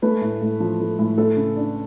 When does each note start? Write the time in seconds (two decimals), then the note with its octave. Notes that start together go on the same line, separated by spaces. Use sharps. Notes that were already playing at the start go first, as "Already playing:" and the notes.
0.02 A3 B4
0.22 A2
0.41 A2
0.60 F3
0.80 A3
0.99 A2
1.18 A3 A4
1.37 C#3
1.56 D4